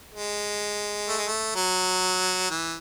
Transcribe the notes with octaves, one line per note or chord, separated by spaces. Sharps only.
G#3
A3
G#3
A3
F#3
E3